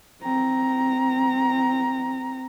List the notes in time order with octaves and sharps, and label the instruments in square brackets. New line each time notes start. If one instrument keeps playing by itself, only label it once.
[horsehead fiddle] C4 A#5